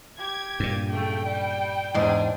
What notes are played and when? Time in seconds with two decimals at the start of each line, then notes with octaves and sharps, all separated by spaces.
0.19 G4 G#6
0.60 G2 A#2
0.90 C#3 F#3 A3 G5
1.24 G3
1.94 E2 G#2 D4 G#4